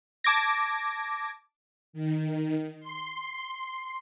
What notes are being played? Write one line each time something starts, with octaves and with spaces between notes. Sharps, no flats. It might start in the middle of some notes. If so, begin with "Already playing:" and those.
A5 D6 G#6 A#6
D#3
C6